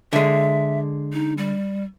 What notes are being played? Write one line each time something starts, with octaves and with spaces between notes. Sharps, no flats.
D3 G#3 E5
D#4
G3